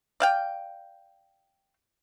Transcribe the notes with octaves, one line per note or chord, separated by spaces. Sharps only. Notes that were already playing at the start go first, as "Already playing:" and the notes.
D5 F5 G5